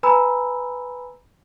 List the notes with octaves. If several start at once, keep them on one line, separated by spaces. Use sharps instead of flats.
B4 G#5 A#5 B5 E6